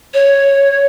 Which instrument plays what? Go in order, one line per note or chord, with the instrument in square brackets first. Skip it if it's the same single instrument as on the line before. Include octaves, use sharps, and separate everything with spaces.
[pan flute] C#5